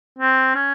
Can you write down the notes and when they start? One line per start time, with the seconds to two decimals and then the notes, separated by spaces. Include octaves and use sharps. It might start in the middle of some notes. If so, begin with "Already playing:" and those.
0.18 C4
0.55 C#4